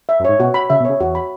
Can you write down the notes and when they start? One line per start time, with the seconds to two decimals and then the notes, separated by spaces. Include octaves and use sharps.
0.09 E5
0.20 F#2
0.25 G#2 C#5
0.39 B2 F#4
0.54 B5
0.70 C#3 E5
0.80 B2
0.85 C#3 C#5
1.00 E2 F#4
1.15 B5